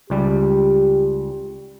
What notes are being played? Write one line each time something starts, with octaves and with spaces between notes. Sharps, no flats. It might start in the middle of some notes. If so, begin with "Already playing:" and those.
C#2 G3 G4